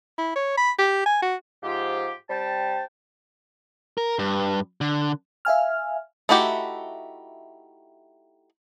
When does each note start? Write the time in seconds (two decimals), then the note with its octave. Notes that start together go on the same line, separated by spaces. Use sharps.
0.18 E4
0.36 C#5
0.57 B5
0.79 G4
1.06 G#5
1.22 F#4
1.63 G#2 F3 F4 G4
2.29 G3 C4 G5 A5
3.98 A#4
4.19 G2
4.81 D3
5.45 E5 F5 G#5 F6
6.29 A3 D#4 E4 F#4 G4